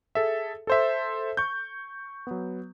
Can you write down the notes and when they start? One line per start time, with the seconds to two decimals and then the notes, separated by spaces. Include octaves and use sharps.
0.15 G#4 A4 E5
0.67 A4 C5 E5
1.37 C#6 G6
2.27 F#3 B3